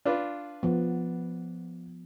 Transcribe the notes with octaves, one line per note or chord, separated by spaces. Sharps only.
D4 F4 B4
F3 B3